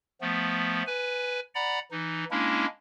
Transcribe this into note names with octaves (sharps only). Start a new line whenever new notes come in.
F3 A3 B3
B4 G#5
D5 F#5 A#5 B5
E3 D#4
G#3 A#3 C#4 D4 E4